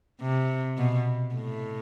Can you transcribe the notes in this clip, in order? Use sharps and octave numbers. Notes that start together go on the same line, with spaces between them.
C3
B2
A2